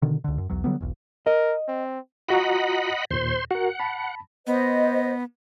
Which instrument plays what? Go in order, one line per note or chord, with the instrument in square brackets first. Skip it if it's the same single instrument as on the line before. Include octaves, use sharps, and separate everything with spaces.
[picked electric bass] B2 D3 D#3
C#2 D3
F#2
B1 E2 F#3
D3 F#3 G3 B3
E1 B1
[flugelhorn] A#4 [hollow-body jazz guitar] D#5
[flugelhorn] C4
[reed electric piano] F4 F#4 A#5 [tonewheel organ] D#5 F#5 B5
[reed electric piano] D#2 A#2 [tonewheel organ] C5 C6
[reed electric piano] F#4 A#4 [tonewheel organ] F#5
[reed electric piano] A5 B5
[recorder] B3 [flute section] C5 D#5